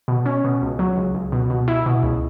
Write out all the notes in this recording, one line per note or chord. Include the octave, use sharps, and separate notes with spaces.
B2
C#4
B2
C#2
F#3
C#2
C#2
B2
B2
E4
B2
C#2